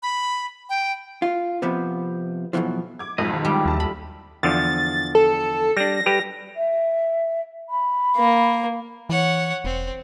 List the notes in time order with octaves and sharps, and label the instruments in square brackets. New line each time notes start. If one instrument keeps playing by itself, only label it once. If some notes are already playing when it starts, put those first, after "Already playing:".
[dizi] B5
G5
[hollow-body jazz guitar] F4
C3 F3 B3
B1 E2 B2 E3 F3
[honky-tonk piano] D6 G#6
[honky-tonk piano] B1 F2 G#2 [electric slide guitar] D#5
[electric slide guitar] D3 D#3
[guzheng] G3
[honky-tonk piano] A#1 A5 [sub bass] D#2
[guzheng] B5
[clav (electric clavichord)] E2 D3 F3 [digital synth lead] A6
[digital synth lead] A4
[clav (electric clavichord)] G3 D4 [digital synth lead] A#6
[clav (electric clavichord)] G3 G4 B4
[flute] E5
B5
[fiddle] A#3
[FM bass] E3 [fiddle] C#5 F#5
[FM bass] E1 [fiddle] C4